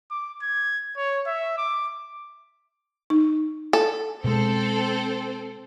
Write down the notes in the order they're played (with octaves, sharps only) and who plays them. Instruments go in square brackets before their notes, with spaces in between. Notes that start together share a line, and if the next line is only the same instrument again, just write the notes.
[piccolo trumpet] D6
G#6
C#5
E5
D6
[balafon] D#4
[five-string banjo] A4
[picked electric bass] B2 G#3 [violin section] C4 A4 C5